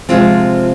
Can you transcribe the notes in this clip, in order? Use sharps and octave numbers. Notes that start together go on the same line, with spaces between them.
C3 F3 G#3 C4 F4